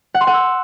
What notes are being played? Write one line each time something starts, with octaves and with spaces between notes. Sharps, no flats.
F#5
C6
F#5
E6